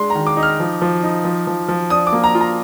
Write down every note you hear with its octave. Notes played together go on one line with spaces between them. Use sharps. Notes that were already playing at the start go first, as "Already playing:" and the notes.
Already playing: G#3 D4 C6
A#5
D#3
D6
D#4
F6
F3
F3
D#4
F3
F3
F3
D4 D#6
D6
A#3
A#5
F4
A#5